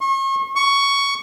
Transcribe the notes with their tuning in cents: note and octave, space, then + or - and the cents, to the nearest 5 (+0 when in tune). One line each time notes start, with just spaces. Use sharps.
C#6 -40
C#6 +10